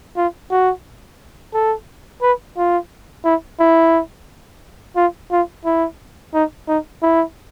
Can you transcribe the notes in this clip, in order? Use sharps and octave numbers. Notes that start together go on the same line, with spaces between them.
F4
F#4
A4
B4
F4
E4
E4
F4
F4
E4
D#4
D#4
E4